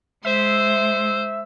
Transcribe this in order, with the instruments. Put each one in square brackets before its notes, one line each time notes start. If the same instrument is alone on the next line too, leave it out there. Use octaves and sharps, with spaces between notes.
[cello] G#3 [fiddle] C5 [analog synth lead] E5